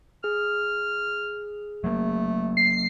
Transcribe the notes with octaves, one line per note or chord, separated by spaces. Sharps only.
G#4 F6
F#3 A3 A#3
C7